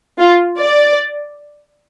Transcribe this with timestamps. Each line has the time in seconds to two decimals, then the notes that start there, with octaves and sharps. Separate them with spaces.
0.19 F4
0.58 D5